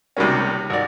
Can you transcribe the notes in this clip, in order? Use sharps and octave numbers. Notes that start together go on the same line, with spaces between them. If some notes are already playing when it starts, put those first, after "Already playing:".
C#2 C3 D#3 G3 A#3 C#4
G#1 D5